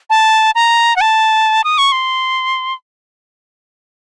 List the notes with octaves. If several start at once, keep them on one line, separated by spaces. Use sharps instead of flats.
A5
A#5
F#5
A5
D#6
C#6
C6